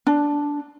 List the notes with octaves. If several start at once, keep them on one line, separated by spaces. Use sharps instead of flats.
D4